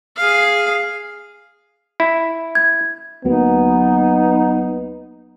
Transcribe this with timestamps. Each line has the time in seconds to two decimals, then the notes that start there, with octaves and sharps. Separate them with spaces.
0.16 G#4 F5
2.00 E4
2.55 G#6
3.25 D2 F#3 A#3 B3 D#4